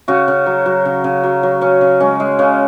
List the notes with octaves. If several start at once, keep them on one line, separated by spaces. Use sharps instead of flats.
C#3 F#4
C#3
F#3
F#3
C#3
C#3
F#3
F#3
C#3 C#4
C#3
G#3 C#4
G#3
C#3 C#4